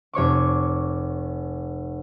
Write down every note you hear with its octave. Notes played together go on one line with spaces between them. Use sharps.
F1 C#5 C#6 D6